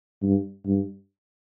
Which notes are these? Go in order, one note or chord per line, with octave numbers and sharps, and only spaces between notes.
G2
G2